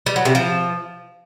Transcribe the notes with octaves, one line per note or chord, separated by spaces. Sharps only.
G3
F#3
C3
F3